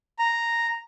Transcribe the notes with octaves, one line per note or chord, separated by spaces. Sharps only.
A#5